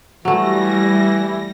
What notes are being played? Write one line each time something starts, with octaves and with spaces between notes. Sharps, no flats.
E3 F#3 G3 A3 E4 A#6